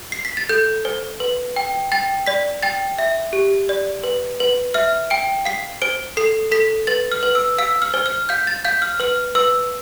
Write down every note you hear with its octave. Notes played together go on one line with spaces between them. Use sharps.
C7
B6
A6
A4 G6
C5
B4
G5
G5 A6
D5 B6
G5 A6
E5
G4
D5
B4
B4
E5 F6
G5 D7
F5 C7
C5 D7
A4 C7
A4 B6
B4 A6
F6
B4
E6
F5 E6
F6
C5
F6
F5 G6
A6
F5 G6
F6
B4 F6
B4 E6